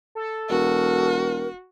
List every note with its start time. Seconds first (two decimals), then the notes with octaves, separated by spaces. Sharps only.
0.15 A4
0.50 E1 F#4 A#4